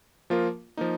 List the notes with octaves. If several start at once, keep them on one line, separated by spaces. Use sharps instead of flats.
F3 A#3 F4 A#4
F3 A#3 D#4